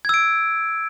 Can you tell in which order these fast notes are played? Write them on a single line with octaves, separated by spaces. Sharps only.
G#6 E6 D7